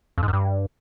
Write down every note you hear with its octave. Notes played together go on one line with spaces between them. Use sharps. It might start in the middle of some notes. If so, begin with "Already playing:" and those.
F2
G#2
F#2
G2